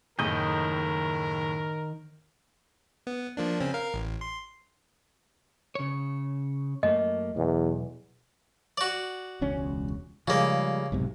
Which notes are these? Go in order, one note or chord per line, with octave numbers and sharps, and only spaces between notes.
F#1 A2 D#3 A#4 D#5 G6
B3
F3 A#3 D4
C#3 C4 C#4
A#4 F5
A1
C6
C#3 C#5
F#2 A3 A#3 D#5
B1 E2
F#4 D5
E1 C#2 C#4
C#3 F3 G3 G#3 A#3
B1 G#2 C3